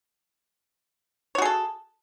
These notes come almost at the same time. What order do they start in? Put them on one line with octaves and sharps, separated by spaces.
C#5 F#4 G#4 A4